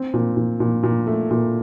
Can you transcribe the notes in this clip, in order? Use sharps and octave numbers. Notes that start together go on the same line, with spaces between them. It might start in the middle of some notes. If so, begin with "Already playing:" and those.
Already playing: C4
A#2
A#2
A#2
A#2
A3
A#2